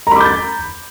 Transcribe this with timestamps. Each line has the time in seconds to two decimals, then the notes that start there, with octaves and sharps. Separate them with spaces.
0.07 A#5
0.11 B5
0.16 D6
0.21 G6
0.25 A6